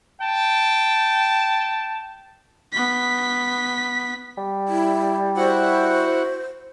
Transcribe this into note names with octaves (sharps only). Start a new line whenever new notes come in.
G5 A5
B3 B6
G3
E4
E4 F#4 C5 F#5